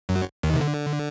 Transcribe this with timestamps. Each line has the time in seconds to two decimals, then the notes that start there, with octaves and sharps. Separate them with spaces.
0.09 F#2 F#3
0.43 D#2 D#3
0.54 C3
0.61 D3